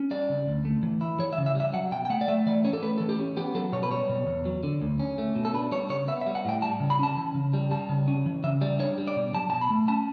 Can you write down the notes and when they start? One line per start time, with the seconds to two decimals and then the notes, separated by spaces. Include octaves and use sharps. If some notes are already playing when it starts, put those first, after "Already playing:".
Already playing: C#4
0.11 G3 D5
0.29 C#3
0.47 D2
0.65 A3
0.83 E3
1.01 E4
1.19 E3 C#5
1.33 E5
1.38 C#3
1.46 E5
1.55 G3
1.60 E5
1.73 F#3 F#5
1.92 B2 G5
2.05 G5
2.10 A3 F#5
2.21 D5
2.28 A3 E5
2.46 E3 D5
2.65 C#4 C#5
2.73 A4
2.82 A3 B4
2.98 E3 A4
3.09 G4
3.19 C#4
3.37 B3 G4
3.55 F#3 A4
3.73 B2 C#5
3.83 B4
3.90 G3 C#5
4.09 B2
4.27 E2
4.45 F#3
4.63 D3
4.82 D2
5.00 C#4
5.18 A3
5.36 B2
5.45 A4
5.54 D4 B4
5.72 G3 C#5
5.90 C#3 C#5
6.08 B3 E5
6.21 E5
6.27 G3
6.35 F#5
6.45 A2 G5
6.62 G3 A5
6.80 C#3
6.90 B5
6.99 C#4 A5
7.17 E3
7.35 C#3
7.53 G3
7.71 G3 A5
7.89 C#3
8.08 C#4
8.26 E3
8.43 C#3 E5
8.61 G3 D5
8.79 D4 C#5
8.98 G3
9.08 D5
9.16 B2
9.34 F#3 A5
9.50 B2 A5
9.61 B5
9.70 A3
9.88 C#4 A5